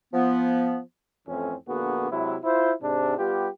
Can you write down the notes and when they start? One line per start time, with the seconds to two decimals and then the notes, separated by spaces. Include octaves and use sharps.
0.14 F3 B3
1.28 F2 A2 E3 C4 C#4
1.69 A#1 D3 A#3 B3 F#4 G#4
2.11 C3 F#3 G#3 E4
2.44 E4 F4 C5
2.82 G#2 C3 D4
3.18 G3 B3 F4 G4